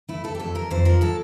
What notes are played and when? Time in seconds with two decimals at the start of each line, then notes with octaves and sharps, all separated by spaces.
0.08 A3 E4
0.24 A3 A4
0.35 G4
0.40 F2 A4
0.55 F2 A#4
0.70 F2 C5
0.85 F3 A#4
1.01 A2 A4